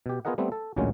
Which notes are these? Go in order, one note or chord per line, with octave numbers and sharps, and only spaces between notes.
B2 G4
B3 F4 G#4 A#4 D#5 F#5
G3 A3 B3 C4
A4
A1 D2 A#2 F#3 G#3 C#4